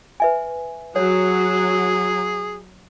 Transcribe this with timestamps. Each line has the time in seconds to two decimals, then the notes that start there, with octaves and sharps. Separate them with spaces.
0.20 B4 E5 G#5
0.96 F#3 G#4 C#5